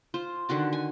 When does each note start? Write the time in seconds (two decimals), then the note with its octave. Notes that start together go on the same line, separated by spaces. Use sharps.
0.14 F4 C5
0.49 D3 D#3 F#4 A5
0.73 G#5